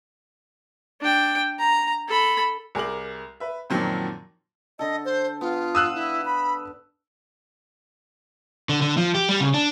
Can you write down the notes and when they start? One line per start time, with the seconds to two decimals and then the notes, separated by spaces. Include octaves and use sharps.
1.01 D4 G5
1.59 A#5
2.08 A4 B5
2.75 C2 G#4 A#4 D6 F#7
3.40 B4 E5
3.70 F#2 A#2 D#3 F3 F#3 C4
4.79 D3 A4 D#5
5.05 C5
5.41 B3 F4
5.75 F5 D#6 E6 F#6
5.95 E4
6.25 B5
8.69 D3
8.82 D3
8.97 F3
9.15 G4
9.29 G3
9.40 C#3
9.54 D4